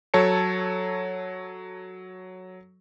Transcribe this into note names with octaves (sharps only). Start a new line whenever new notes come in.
F#3 A4 C#5 A5 C#7